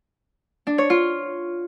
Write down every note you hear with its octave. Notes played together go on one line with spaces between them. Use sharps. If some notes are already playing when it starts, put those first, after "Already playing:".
D4
C#5
F4